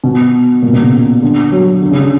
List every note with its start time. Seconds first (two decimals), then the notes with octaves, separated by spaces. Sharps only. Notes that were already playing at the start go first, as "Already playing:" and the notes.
0.04 B2
0.62 A#2
0.72 B2
0.82 C#3
1.22 D3
1.52 F#3
1.82 D3
1.91 C#3
2.01 D3